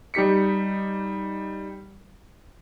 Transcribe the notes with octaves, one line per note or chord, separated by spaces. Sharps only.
G3 D#4 G4 B6 C#7